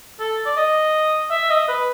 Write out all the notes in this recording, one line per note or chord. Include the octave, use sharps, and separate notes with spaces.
A4
D5
D#5
E5
D#5
B4